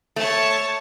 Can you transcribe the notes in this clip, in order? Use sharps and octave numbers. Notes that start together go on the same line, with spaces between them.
A3 C#5 A5